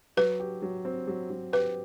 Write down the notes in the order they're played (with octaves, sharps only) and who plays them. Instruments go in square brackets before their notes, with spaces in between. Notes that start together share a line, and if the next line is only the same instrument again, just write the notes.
[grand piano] F#3 [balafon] B4
[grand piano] G4
F#3
C4
F#3
F#3
[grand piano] G4 [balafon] B4